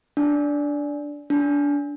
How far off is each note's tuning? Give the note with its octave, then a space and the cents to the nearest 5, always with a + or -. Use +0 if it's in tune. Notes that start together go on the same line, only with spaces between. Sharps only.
D4 -10
D4 -25